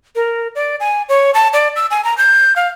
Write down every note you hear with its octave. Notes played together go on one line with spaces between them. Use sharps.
A#4
D5
G#5
C#5
A5
D5
E6
G#5
A#5
G6
F5